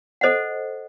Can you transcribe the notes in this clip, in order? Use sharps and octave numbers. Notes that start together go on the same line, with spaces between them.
A4 C5 D#5 F#5